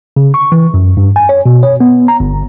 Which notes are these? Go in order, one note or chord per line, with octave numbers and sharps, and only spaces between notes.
C#3
C#6
E3
F#2
G2
G#5
C#5
B2
C#5
B3
A#5
G1